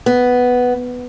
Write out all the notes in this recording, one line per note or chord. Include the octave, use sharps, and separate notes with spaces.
B3